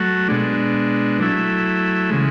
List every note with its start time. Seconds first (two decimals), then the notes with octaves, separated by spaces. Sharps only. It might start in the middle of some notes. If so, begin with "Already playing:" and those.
Already playing: F#3 A3 F#4
0.28 B2 G#3 D4
1.19 F#3 A3 E4
2.10 C#3 E3 G#3